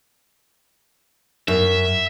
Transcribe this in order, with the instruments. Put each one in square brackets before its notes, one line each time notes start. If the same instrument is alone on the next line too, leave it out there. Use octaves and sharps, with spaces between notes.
[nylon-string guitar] F#2 [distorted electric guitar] E5